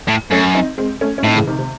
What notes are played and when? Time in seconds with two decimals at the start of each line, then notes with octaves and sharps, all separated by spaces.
0.08 A2
0.31 F#2 A3 C#4
0.54 C4 D#4
0.78 G#3 C4
1.01 A3 C#4
1.18 C#4
1.24 A2 C4 D#4
1.35 C#3 E3
1.47 C3 D#3
1.59 C3